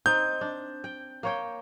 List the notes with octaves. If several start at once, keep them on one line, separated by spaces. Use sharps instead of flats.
C4 D#4 G6
D4
G5
A#3 C#5 G5